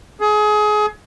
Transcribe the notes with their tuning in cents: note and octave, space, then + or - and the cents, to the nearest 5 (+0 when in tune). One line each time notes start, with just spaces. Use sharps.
G#4 +25